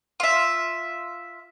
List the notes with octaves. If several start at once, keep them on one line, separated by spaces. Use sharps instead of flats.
F4 E5